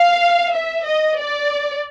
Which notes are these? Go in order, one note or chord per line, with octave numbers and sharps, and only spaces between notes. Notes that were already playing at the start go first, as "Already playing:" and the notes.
Already playing: F5
E5
D#5
D5